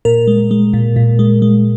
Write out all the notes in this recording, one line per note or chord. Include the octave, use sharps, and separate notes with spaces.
A#2 A#4
G#3
G#3
A#2
A#2
G#3
G#3